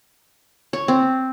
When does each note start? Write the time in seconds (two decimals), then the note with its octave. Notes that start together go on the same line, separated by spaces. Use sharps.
0.73 C#5
0.88 C4